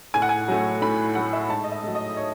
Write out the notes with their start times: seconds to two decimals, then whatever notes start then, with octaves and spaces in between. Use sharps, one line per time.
0.14 A2 G#5
0.22 F#5
0.29 G#5
0.48 F#3 A3
0.82 A2 B5
1.15 F#3 A3 F#5
1.33 E5
1.49 G#2 A5
1.64 D#5
1.72 E5
1.83 F#3 A3
1.95 D#5
2.17 C#5